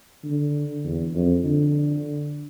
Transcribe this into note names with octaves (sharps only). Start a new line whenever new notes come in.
D3
E2
F2
D3